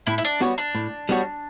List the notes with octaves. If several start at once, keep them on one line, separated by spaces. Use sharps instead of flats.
A2 E4
E4
D4
G3 B3 F#4 C#5
D4
A2
G3 B3 F#4 C#5